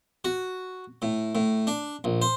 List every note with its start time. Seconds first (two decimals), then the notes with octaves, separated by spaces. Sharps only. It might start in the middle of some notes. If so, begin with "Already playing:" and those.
0.25 F#4
1.02 A2
1.35 A2
1.67 D4
2.04 A#1
2.22 C5